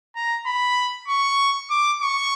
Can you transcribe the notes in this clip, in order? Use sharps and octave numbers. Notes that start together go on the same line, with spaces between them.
A#5
B5
C#6
D6
C#6